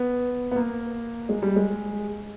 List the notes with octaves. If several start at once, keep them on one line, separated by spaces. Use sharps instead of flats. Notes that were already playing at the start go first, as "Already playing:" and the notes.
Already playing: B3
B3
A#3
G#3
G3
G#3